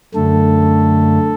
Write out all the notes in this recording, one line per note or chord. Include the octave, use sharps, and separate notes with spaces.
F#2 D3 A3 A4